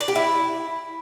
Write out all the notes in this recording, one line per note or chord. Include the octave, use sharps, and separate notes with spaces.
D5
G4
E4